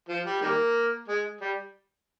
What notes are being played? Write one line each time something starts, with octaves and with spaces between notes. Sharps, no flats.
F3
G3
D#3 G3 A#3
G#3
G3